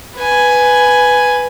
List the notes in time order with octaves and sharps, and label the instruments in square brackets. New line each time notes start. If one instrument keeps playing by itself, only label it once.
[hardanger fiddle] B4 G#5